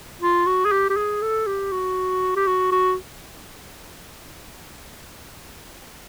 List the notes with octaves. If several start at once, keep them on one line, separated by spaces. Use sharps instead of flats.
F4
F#4
G#4
G4
G4
G#4
A4
G4
F#4
G4
F#4
F#4